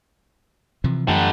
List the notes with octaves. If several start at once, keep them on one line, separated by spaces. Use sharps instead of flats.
C3 E3 F3
F#2 D3 E3 G3 A3